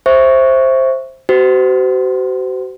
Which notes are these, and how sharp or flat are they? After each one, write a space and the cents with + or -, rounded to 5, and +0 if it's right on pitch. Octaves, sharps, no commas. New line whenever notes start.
C5 +10 E5 +0 C#6 +5
F#4 +40 C5 -35